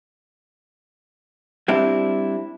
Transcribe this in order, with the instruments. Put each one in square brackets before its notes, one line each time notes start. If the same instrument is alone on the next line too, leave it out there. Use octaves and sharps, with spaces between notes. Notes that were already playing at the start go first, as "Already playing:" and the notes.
[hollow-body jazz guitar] G3 C4 D4 E4